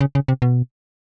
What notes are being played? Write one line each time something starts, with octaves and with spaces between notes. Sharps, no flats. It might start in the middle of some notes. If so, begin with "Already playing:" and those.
C#3
C#3
C3
B2